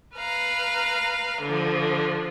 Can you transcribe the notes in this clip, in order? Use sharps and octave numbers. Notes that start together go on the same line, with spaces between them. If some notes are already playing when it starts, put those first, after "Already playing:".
B4 F5 A#5
D3 F3